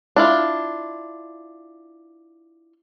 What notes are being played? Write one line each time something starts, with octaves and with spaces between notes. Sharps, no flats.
D4 E4 F4